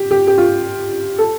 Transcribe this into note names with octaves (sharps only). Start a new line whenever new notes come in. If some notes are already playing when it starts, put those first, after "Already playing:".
Already playing: G4
G4
G4
F4
A4